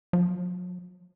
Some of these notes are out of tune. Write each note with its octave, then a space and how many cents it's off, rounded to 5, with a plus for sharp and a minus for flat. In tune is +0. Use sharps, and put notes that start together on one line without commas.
F#3 -45